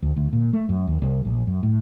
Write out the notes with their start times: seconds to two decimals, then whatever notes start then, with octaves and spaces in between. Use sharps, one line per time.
0.02 D2
0.16 D2
0.33 A#2
0.53 A3
0.69 F#2
0.87 D#2
1.02 C2
1.25 A#1
1.47 F#2
1.63 A2